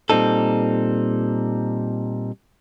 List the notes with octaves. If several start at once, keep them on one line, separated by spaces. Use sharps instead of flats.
A#2 G3 C4 D#4 A4